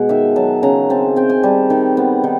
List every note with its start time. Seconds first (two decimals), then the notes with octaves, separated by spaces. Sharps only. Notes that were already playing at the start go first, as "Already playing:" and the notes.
Already playing: B2 G#3 F#5
0.09 D#3 E5
0.36 F#3 A5
0.63 C#3 A#5
0.90 C4 A5
1.16 C4 G5
1.30 G#5
1.43 G3 A5
1.70 D#3
1.97 B3
2.24 D#3